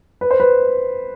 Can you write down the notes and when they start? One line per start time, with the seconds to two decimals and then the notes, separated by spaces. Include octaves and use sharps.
0.21 B4
0.31 C5
0.40 B4